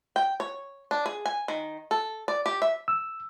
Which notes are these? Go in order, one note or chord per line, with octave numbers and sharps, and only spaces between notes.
G5
C#5
D4
G#4
G#5
D#3
A4
D5
G4
E5
E6